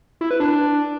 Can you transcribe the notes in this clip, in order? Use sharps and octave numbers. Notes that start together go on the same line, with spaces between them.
E4
B4
D4